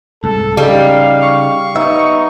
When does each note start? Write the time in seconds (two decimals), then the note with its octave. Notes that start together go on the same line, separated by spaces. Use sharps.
0.24 C2 G#2 A4
0.57 C#3 G3 D#4 F5
1.23 C#6
1.76 B3 D#4 E5